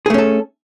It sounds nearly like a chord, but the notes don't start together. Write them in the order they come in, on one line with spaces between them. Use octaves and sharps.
G#4 A3 C#4 A4